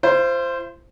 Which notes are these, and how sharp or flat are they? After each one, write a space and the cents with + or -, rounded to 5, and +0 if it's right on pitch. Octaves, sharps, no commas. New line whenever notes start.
F4 -45 C5 +0